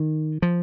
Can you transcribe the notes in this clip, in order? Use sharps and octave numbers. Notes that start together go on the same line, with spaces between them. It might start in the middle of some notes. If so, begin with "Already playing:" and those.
Already playing: D#3
F3